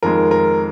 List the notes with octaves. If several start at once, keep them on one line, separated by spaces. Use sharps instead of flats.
F2 D#3 G#3 A#4
A#4